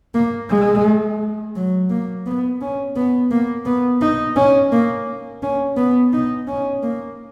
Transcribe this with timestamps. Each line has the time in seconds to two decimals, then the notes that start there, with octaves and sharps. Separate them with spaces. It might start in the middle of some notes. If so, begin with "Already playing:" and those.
0.15 A#3
0.50 G#3
1.56 F#3
1.90 A#3
2.26 B3
2.61 C#4
2.96 B3
3.31 A#3
3.66 B3
4.02 D#4
4.36 C#4
4.72 A#3
5.43 C#4
5.77 B3
6.13 D#4
6.48 C#4
6.83 A#3